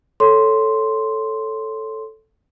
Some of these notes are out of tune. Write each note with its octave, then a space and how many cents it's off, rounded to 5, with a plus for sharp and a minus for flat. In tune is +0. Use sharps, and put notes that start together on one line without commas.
A4 +0 C#5 +0 C6 +0